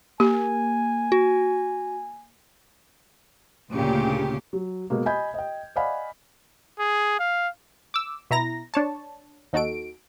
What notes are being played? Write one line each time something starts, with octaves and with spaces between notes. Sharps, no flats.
A#3 G4 G#5
F#4
D2 A#2 C#3 G4
F#3
B2 G#3 A#3
D#5 G#5 B5 G6 G#6
D#5 G5
D5 D#5 F5 F#5 G#5 B5
G#4
F5
D6 E6
B2 E4 A#5 A#6
D4 C#5 A5
D#2 D#4 F#4 A4 D7